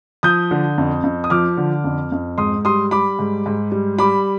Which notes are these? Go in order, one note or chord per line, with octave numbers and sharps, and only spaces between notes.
F3 D#6 G6
D3
F2
F2
D#6
F3 D6 F6
D3
F2
F2
G#2 C6 D#6
G3 C6 D#6
G3 B5 D6
G#2
G#2
G3
G3 B5 D6